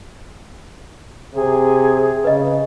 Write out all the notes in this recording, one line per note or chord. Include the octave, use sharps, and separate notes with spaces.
C3 G#4
C#3 B4 D#5